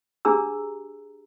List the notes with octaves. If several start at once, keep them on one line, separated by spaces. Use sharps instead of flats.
D4 G4 G#4 A#5 E6